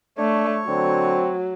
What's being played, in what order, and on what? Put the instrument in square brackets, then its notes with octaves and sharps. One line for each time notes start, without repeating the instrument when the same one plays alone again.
[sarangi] A3 [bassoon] D4 [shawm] C#5
[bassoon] D3 [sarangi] F#3 [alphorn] C4